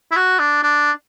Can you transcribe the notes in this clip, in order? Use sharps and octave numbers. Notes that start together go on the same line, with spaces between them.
E4
F#4
D4
D4